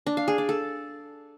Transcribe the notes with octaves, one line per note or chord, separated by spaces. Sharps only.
D4
F5
G#4
D5
A4